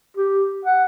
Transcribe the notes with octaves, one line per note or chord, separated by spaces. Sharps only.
G4
F#5